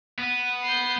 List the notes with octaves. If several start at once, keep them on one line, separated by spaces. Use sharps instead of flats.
B3
G6 C7